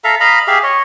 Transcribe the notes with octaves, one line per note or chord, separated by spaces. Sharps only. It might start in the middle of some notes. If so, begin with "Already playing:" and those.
A4 E5 F5 A#5
D#5 F5 A#5 B5
G4 G#4 E5 F5
C#5 D#5